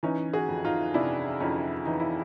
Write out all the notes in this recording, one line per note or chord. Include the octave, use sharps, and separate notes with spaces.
E3 C#4 D#4
F#4 G#4
F2
D#4 F4
C3 D4 E4
F2 C#4 D#4
E3 D#4
E4